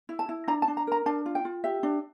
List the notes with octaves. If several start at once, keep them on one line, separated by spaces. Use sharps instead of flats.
E4
A5
E4
D4 A#5
A5
D4
A#5
A#4 A#5
D4 A5
F4
G5
F4
G4 E5
D4